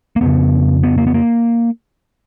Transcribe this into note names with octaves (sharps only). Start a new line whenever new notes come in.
A#3
F2 C#3 B3
B3
A#3
B3
A#3